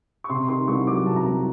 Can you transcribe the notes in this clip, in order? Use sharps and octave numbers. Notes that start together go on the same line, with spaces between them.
C#6
C3 C6
D#3 C6
C2 C#6
F#3 D6
C3 A5
A#5
C2